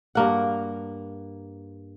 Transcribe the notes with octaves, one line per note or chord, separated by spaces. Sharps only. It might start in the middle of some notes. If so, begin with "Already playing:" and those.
G2 A#3 F#5